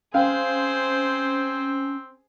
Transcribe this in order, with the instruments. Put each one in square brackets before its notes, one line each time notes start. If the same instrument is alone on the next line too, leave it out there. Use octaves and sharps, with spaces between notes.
[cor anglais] C4 [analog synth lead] C#4 [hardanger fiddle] G#4 C5 [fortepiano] F5 G5